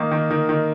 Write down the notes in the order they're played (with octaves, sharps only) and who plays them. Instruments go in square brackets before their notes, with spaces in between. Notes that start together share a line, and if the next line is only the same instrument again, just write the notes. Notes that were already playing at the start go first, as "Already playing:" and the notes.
Already playing: [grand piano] D#3 A#3 D#4
D#3
D#3
D#3